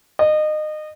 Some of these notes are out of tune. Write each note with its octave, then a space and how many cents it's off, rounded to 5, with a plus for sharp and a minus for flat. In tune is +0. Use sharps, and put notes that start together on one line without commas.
D#5 -25